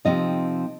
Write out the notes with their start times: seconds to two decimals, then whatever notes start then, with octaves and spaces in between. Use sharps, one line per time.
0.05 C3 F3 C4 D#4 D#5